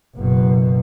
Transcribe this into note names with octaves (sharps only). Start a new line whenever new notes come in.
F#1 B2